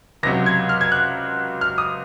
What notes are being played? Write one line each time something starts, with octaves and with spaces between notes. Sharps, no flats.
C#2 C3 F#3 A#6
G#6
F6
G#6
F#6
F6
D#6